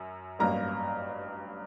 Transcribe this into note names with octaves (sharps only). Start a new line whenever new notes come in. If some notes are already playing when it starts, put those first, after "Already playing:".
Already playing: F#2
A1 G2 F#3 A#3 A#5